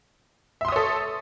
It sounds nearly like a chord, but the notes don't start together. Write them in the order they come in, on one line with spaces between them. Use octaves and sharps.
E5 C6 D#6 C#5 A4